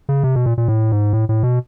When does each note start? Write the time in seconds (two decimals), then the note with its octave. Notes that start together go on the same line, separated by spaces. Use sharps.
0.09 C#3
0.24 C3
0.36 B2
0.46 A#2
0.58 A#2
0.68 A2
0.92 G#2
1.13 A2
1.29 A2
1.43 B2